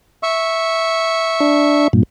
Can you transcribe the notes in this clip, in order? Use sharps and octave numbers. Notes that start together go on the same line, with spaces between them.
E5 C#6
D4
G2 A#2